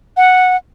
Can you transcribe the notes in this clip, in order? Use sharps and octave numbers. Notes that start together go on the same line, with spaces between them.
F#5